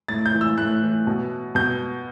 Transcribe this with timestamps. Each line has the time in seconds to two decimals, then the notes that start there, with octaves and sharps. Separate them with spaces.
0.08 A2 A6
0.26 G6
0.34 E3
0.41 E6
0.58 A2 F#6
0.82 E3
1.07 B2
1.55 B2 G6